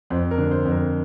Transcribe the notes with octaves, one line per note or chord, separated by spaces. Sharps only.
F2 C5
A#4
D3
C5
F2
A#4